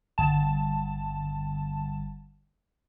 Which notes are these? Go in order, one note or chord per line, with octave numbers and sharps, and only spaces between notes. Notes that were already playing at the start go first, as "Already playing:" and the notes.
G1 A5